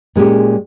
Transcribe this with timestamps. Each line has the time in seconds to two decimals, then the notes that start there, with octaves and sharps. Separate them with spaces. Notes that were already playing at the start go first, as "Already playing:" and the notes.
0.16 A#2 G#3 C#4 G4